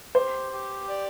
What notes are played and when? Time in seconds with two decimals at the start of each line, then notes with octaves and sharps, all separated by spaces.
0.14 G4 C5
0.52 G4
0.89 D5